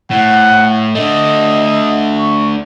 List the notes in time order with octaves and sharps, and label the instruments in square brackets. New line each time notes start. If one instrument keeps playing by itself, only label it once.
[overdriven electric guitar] A2 [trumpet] F#5
[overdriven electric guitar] A3 D4 [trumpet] D#5
[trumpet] C#6